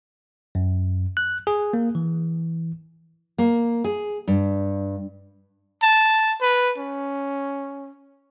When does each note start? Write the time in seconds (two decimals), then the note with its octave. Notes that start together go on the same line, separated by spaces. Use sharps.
0.55 F#2
1.17 F#6
1.47 G#4
1.73 A#3
1.95 E3
3.38 A#3
3.84 G#4
4.28 G2
5.82 A5
6.41 B4
6.78 C#4